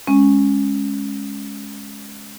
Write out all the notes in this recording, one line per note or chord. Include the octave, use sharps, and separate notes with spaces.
G#3 C#4